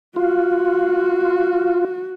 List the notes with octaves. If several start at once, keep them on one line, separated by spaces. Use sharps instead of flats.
F4 F#4